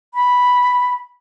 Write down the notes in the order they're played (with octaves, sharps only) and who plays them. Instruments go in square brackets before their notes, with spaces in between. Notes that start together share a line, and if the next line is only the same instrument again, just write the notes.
[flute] B5